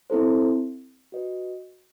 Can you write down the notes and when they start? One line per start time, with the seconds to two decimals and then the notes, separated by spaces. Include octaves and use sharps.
0.10 C4 E4 A4 C5
1.12 F#4 B4 D#5